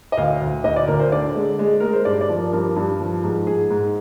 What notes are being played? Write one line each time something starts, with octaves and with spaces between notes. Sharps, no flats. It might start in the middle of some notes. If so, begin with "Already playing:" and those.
D#5
D2 F5
D2
D2 D#5
D5
D2 A#4
C5
D3 D5
G#3
G#3
G#3 A#4
C5
G2 D5
D5
F3
A#4
G2 A#4
G2
F3
G#2
G#2 G#4
G#2